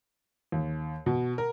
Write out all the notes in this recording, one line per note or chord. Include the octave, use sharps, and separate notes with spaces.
D#2
B2
A#4